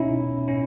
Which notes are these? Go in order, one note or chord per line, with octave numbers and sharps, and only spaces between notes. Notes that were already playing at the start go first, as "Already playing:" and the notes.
Already playing: B2 C#4 D#4 E4
B2
A2 C#4 E4